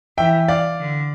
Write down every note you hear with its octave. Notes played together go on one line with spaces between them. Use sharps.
E3 E5 G5
D5 F5
D3